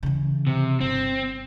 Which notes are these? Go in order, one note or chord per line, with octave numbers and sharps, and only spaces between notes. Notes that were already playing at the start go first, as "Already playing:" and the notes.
C#3 E3
C3
G1 C4